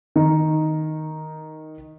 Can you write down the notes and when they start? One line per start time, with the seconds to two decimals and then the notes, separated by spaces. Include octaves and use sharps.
0.16 D#3 D#4